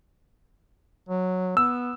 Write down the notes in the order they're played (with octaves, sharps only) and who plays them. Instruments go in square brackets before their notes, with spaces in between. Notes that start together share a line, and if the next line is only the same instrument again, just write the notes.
[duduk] F#3
[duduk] B3 [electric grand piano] E6